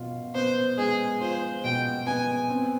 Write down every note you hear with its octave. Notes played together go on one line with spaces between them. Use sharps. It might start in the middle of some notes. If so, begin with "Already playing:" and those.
Already playing: B2 F4
B3 C5
G#3 G#4
F4 C5
B2 G5
B3 G#5
C4